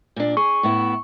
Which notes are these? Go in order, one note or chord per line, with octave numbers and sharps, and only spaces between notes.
A#2 D4
G#4 C#6
A2 B3 E4